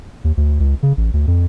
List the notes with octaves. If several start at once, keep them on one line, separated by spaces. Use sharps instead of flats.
D#2
D2
C#2
C#3
A1
D2
F2